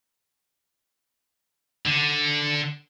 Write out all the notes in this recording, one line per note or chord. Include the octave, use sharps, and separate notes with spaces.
D3